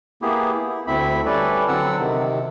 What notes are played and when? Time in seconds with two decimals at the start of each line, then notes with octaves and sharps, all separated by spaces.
0.22 A#3 B3 E4 G4 G#4
0.69 E4
0.87 D2 A3 C4 E4 E5 B5
1.26 G3 C#4 E4 A4 B4 D5
1.68 D3 F#3 C4 F#5 A5 E6
1.98 C3 D#3